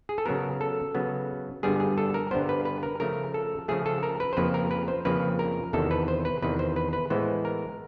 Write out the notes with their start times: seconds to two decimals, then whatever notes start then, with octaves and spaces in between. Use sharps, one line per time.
0.09 G#4
0.18 A4
0.26 C#3 F#3 B3 A#4
0.61 A4
0.95 C#3 F#3 B3
1.63 G2 D3 G3 B3 G#4
1.80 G#4
1.98 A4
2.14 A#4
2.31 G2 D3 G3 B3 C5
2.49 B4
2.65 B4
2.83 A#4
3.00 C#3 F3 A3 A#4
3.34 A4
3.68 C#3 F3 A3 G#4
3.86 A4
4.03 A#4
4.20 B4
4.33 C5
4.37 F2 C#3 F3 A#3 B4
4.54 A#4
4.71 B4
4.88 C5
5.05 F2 C#3 F3 A#3 B4
5.39 A#4
5.73 E2 C3 D#3 A4
5.91 B4
6.08 C5
6.25 B4
6.42 E2 C3 D#3 B4
6.59 C5
6.76 B4
6.93 B4
7.10 A2 E3 G#3 B3 C5
7.45 A#4